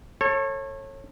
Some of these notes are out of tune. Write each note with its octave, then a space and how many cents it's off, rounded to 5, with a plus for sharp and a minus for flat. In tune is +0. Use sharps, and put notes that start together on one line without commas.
A4 +20 C#5 -25